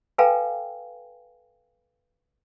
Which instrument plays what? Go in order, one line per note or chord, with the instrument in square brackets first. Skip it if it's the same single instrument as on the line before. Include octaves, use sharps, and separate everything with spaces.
[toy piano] A4 B4 F5 G5 G#5 A#5